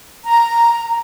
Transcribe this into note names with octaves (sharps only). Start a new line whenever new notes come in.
A#5